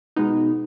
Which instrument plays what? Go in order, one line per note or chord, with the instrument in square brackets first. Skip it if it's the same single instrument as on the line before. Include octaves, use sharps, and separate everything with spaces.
[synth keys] B2 G#3 B3 D#4